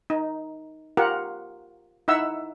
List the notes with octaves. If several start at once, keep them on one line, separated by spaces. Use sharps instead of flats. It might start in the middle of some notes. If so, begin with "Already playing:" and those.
D#4
F4 G4 A#4 F#5
D#4 E4 E5 F#5 E6